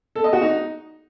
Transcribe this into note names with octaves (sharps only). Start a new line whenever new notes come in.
A4
D#5
F#4
D#4